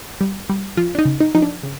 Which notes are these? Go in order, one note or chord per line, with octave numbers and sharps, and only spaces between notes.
G3
G3
F3 F4
D4
D#4
C#3
D#4
F3 D#4
D4
C#3